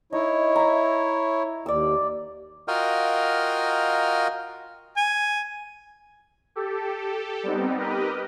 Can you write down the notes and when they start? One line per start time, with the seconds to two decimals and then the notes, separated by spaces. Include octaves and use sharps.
0.13 D#4 E4 C#5
0.56 E5 A#5
1.66 D#2 D5 E6
2.68 F4 F#4 A#4 D#5 F5 G5
4.97 G#5
6.55 G4 A4
7.43 G3 B3 C4 D#4
7.77 G4 A#4 B4 D#5